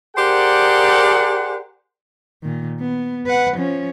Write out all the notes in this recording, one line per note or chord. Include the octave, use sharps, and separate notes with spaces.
G4 G#4 A#4 C5 D5 F#5
A#2 D#3
B3
B4 F#5
F3 C#4